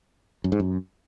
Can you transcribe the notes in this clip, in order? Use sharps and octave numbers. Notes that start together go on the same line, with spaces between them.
F#2
G#2
F#2